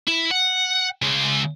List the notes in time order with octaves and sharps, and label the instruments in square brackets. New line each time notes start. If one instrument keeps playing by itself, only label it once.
[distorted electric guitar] E4
F#5
C#3 G#3